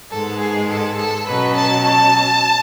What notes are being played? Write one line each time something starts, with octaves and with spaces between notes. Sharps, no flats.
G#2 D#3 G#3 B3 A4
G#4
A4
A4
B2 F#3 C#4 B4
A5
A5